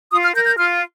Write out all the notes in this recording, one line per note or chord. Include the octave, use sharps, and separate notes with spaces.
F4 D#6
F6
A#4 G6
G6
F4 F6